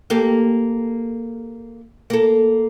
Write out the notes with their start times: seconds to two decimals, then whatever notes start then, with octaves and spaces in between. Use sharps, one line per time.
0.10 A#3 G4 A4
2.10 A#3 A4